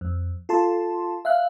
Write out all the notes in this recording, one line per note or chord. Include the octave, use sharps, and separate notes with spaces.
F2
F4 A4 A5 C6
E5 F5 F#6